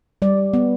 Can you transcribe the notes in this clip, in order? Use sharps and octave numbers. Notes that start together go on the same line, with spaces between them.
G3 D5
B3